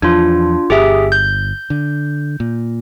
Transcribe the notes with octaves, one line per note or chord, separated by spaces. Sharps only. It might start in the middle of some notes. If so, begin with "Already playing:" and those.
E2 F3 D4 F4
G1 G4 G#4 E5
G6
D3
A#2